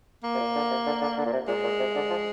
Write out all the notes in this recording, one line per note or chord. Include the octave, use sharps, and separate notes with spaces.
A#3
C3
A#2
D3
C3
D3
D3
D3
A#2
C3
A#2 G#3
A#2
C3
D3
F3